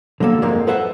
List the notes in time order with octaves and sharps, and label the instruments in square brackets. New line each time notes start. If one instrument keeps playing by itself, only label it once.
[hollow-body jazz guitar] D3 F#3 A#3 A4
F2 G#2 G#3 A#3 A#5
A4 B4 C5 E5 F#5 A5